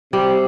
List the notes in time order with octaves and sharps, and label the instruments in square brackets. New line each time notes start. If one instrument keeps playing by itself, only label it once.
[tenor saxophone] C3 [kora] G3